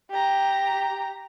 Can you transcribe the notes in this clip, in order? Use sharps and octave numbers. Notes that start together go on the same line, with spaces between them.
G4 A#5